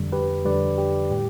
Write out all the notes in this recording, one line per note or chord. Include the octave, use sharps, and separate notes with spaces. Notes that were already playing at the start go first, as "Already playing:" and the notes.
Already playing: F2 D3 G3
G4 B4
F2 D3 G3 B4 D5
G4
A2 G3 G4